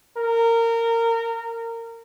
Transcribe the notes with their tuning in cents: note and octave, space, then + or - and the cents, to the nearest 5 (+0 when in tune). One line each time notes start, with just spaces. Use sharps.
A#4 -20